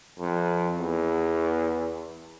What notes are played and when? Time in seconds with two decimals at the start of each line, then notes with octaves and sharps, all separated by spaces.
0.19 F2
0.79 E2